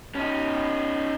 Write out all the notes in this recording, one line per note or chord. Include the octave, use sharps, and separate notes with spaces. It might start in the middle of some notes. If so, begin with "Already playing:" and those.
C#4 D#4